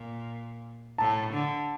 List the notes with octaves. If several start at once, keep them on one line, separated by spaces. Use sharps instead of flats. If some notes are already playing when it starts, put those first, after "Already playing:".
Already playing: A#2
A2 A5
D3